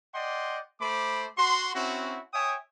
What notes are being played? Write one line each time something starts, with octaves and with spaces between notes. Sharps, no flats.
D5 D#5 F#5 G5 C6
A3 C5 B5 D6
F#4 C6
C4 C#4 E4 F#4
C#5 E5 G5 G#5 D#6